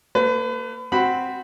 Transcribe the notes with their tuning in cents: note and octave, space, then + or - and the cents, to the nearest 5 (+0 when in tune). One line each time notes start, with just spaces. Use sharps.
A#3 -30 B4 +35
C4 +0 F#4 +0 B5 +5